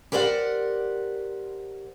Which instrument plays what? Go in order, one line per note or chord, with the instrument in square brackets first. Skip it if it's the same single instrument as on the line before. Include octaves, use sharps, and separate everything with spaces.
[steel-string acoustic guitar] G4 A#4 C5 D5 E5 F#5